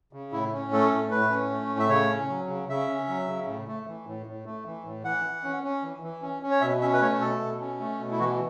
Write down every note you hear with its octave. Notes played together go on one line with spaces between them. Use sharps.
C#3
A2 E4
C#4
A3 A4
A2
A2 B4
C#4
A3
A2
E5
C#3 C#5
C#4
F#3
C#3
C#3 E5
C#4
F#3
C#3
A2
A3
E3
A2
A2
A3
E3
A2
E3 F#5
E3
C#4
C#4
E3
E3
C#4
C#4
C#5
B2 E5
C#4 E5
B4
A3 C#5
B2 A4
B2
C#4
A3
B2
E4
E3 F#4